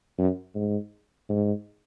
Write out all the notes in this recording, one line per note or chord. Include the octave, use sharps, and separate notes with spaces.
F#2
G#2
G#2